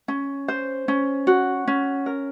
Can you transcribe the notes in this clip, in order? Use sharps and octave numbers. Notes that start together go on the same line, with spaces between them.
C#4
C5
C#4
F#4
C#4
A#4